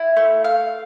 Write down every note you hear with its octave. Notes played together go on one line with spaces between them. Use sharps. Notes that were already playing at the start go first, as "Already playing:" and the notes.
Already playing: E4
A3
F5